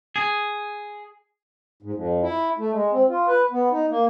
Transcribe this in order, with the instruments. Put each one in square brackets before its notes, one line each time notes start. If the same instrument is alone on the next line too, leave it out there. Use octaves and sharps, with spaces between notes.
[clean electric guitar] G#4
[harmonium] G#2
F2
E4
A3
G#3
C4
F4
B4
B3
D#4
A#3